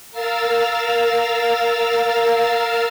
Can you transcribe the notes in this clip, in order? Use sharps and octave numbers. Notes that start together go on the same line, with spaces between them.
A#4 F5 E6 F6 A6